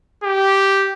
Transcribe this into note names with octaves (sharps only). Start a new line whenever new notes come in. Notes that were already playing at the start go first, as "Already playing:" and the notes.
G4